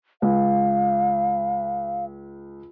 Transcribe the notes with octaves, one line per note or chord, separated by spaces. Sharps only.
C#2 F5